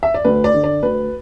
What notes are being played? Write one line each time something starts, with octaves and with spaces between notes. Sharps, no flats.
E5
D5
D2 B4
D5
D3
D5
D2 B4